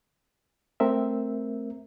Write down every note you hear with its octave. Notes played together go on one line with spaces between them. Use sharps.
A3 C4 A#4 E5